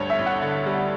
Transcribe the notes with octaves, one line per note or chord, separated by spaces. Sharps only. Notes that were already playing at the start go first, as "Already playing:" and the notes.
Already playing: D2 G2 C#5
E5
A1
F#5
D3
G3